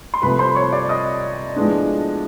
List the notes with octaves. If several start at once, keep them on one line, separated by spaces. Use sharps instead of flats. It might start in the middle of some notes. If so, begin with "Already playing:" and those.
C6
C2 C3 F3 A3 B4 B5
C5 C6
C#5 C#6
D5 D6
D#5 D#6
A2 F3 G#3 B3 D4